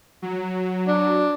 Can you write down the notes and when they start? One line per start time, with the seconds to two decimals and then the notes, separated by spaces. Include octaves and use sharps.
0.22 F#3
0.88 D4